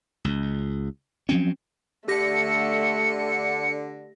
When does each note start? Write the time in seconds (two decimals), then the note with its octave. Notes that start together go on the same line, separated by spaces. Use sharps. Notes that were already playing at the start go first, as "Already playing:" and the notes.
0.24 C#2
1.29 F3 F#3 C4 C#4
2.08 D3 A3 G4 A#6 C#7